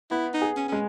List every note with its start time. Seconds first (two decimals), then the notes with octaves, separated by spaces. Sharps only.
0.11 B3 E4
0.34 D#4
0.42 G#4
0.57 C#4
0.69 G#3 C#4